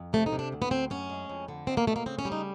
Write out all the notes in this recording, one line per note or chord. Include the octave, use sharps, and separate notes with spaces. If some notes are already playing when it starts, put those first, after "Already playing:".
Already playing: F2
C3 A3
D#4
C3
D4
D2
B3
D2 C4
F#2 C#4
G#3
F2
D3
B2 C4
A#3
B2 A3
A#3
C#3 C4
C#4
G3
D#4